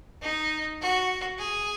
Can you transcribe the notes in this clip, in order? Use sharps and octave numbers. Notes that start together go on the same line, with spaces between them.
D#4
F#4
G#4